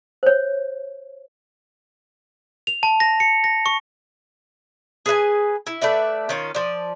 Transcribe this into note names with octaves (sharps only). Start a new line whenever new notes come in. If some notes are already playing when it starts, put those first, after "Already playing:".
C5 C#5
F7
A5
A#6
C#7
A#6
C#6
G#4 B4 E5 G#5
E4
A3 B4 D5 E5
D#3 C#4 F4
F3 D5